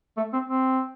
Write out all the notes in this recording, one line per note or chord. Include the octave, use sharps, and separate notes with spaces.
A3
C4
C4